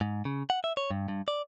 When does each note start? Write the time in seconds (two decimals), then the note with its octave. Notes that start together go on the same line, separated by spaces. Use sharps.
0.01 G#2
0.25 C#3
0.50 F#5
0.64 E5
0.77 C#5
0.91 G2
1.08 G2
1.28 D5